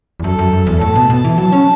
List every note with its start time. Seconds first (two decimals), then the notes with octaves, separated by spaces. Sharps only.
0.20 E2
0.24 F#2 A4
0.39 F#2
0.53 F#2
0.67 E2
0.81 A2 A5
0.95 B2
1.10 B2
1.24 E3
1.38 F#3 A5
1.52 C#4